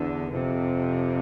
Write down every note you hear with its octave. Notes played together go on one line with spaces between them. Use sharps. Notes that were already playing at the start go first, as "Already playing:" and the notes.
Already playing: E2 D3
F2 C3